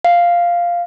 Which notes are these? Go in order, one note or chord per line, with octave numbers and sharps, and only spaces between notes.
F5